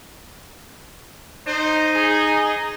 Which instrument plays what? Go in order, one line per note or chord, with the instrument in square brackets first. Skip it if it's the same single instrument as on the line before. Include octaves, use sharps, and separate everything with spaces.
[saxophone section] D#4 [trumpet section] C5
[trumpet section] G#4